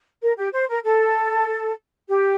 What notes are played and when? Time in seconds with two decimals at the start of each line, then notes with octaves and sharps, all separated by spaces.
0.21 A#4
0.37 G4
0.53 C5
0.68 A#4
0.84 A4
2.08 G4